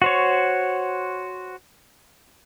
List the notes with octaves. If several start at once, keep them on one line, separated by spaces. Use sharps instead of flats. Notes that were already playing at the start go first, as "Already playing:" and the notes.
F#4 C5 C#5